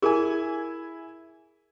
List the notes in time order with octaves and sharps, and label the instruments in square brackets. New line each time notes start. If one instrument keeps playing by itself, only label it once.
[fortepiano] E4 G#5 [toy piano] G#4 A#4